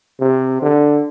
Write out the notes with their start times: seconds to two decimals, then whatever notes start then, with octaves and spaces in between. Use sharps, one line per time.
0.20 C3
0.62 D3